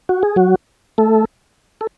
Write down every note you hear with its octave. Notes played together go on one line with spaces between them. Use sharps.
F#4
G#4
F#3 F#4
A3 A4
A4